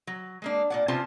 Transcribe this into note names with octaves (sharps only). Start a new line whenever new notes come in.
F#3
G#3 A#3 D4
A#2 D5 F#5
C3 B3 C#4 F4 C5 A5